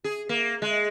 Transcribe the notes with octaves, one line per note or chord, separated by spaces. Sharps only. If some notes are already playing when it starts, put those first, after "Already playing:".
G#4
A#3
G#3